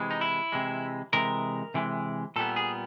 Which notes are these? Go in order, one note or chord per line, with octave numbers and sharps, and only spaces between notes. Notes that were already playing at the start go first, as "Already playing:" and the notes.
Already playing: C3 E3 G#3
D#4
E4
C3 E3 G#3
C3 E3 G#3 A#4
C3 E3 G#3
A#2 G3 B3 A4
G#4